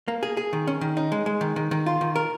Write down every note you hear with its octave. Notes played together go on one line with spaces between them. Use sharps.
A#3
G#4
G#4
D#3
C#4
D#3
D#4
G#3
G#3
D#3
D#3
D#3
F4
D#3
A#4